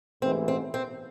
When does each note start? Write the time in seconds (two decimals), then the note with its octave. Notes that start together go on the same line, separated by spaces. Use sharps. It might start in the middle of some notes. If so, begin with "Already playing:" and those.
0.22 A1 G#2 E3 C4
0.48 C4
0.74 C4